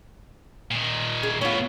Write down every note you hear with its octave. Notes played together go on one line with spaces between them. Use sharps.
A#2 D#3
G#4
A2 B3 F4 C#5